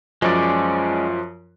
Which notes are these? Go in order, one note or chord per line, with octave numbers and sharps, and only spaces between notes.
F#2 F3 G#3 C#4 D5